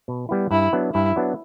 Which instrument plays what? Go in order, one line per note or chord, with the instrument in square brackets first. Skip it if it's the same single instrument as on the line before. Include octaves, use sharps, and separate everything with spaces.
[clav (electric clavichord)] B2
G3 B3 E4
[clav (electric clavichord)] G2 [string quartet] E4
[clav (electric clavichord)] F#3 B3 D4
[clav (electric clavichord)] G2 [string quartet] E4
[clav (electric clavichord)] F#3 B3 D4